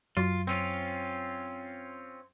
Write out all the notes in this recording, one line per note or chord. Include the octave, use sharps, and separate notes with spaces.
F#2 F#3 F4
C4 C#4 F4